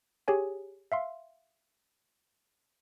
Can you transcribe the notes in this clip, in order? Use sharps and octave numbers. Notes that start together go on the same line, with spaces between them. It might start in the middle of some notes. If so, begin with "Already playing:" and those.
G4 G#4 C#5 G#5
E5 F5 C6